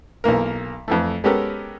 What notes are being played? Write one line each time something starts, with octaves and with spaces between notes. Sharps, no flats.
B1 E3 A#3 A#4
F2 E3 A3
G#3 B3 C#4 G4 A4 A#4